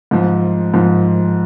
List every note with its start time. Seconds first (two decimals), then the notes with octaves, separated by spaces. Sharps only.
0.11 G#2 F3
0.74 G#2 F3